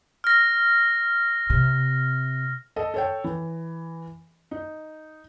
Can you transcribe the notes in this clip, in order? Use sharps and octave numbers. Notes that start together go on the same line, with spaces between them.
F6 A#6
C3
A4 D#5
A4 C#5 G5
E3
D#4